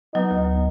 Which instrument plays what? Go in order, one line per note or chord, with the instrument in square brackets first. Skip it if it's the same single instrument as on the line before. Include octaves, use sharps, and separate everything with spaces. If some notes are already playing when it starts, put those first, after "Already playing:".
[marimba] F#3 [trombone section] B3 D#4
[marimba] D2